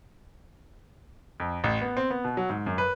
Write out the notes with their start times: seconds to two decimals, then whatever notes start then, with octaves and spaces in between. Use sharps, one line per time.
1.40 F2
1.64 A1
1.81 B3
1.97 C4
2.10 B3
2.25 B2
2.37 F#3
2.50 G#2
2.66 F#2
2.78 B4